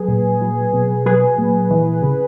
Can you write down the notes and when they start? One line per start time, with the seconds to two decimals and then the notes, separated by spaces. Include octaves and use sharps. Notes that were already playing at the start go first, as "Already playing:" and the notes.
Already playing: F#3 G#4 B4
0.08 A#2
0.41 F#3
0.73 B2
1.06 F#3 G#4 B4
1.38 A#2
1.71 E3
2.03 C#3